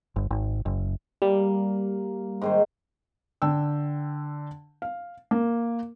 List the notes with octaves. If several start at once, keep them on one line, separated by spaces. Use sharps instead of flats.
G1
G#1
F#1
G3 A#3
G#2 D#3 C5
D3 G5 E6
F5
A#3